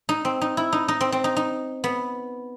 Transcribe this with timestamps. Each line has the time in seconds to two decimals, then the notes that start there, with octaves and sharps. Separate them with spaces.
0.09 D#4
0.25 C4
0.41 D#4
0.57 E4
0.73 D#4
0.88 D#4
1.01 C4
1.12 C4
1.24 D#4
1.37 D#4
1.84 B3